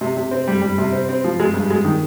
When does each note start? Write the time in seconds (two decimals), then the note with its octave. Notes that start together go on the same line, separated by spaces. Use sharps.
0.01 C3
0.17 C3
0.31 C4
0.48 G3
0.62 G3
0.78 C3
0.92 C4
1.09 C4
1.24 F3
1.40 G#3
1.54 G2
1.70 G#3
1.85 D#3